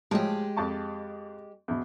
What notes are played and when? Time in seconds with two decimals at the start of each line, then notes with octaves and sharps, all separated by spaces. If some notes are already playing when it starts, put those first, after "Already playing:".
0.11 A2 F3 F#3 G#3 G4
0.57 F2 A5 C#6
1.68 E2 B2